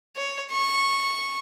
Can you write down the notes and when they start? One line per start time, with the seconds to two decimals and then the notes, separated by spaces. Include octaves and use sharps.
0.17 C#5
0.52 C#6